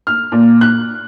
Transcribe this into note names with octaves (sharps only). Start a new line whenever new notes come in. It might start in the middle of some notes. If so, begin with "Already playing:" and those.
F6
A#2
F#6